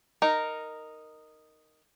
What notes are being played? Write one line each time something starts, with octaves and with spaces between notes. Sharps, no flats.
D#4 A#4